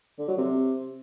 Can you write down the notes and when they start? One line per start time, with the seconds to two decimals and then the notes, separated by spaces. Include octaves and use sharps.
0.19 D3
0.28 F#3
0.38 C3